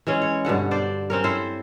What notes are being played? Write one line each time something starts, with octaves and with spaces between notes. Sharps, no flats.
E3 G#3 C#4
C#5
G2 B2 D3 F#5
D4 C5 D5
C4 C#4 A#4
E4 A4 C5